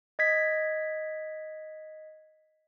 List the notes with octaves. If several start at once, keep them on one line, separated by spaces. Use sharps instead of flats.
D#5 G#6 B6